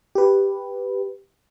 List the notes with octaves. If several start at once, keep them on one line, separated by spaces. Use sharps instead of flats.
G4 B4